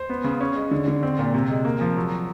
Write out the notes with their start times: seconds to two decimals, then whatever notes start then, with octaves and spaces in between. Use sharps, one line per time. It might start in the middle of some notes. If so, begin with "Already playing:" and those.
Already playing: C5
0.09 B3
0.24 C#3
0.40 C#4
0.55 G#3
0.71 D3
0.88 D3
1.03 C4
1.19 A#2
1.34 C3
1.50 G#3
1.65 A#3
1.81 F3
1.96 F#3